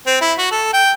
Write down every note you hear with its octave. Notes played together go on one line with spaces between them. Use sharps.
C4
E4
F#4
A4
G5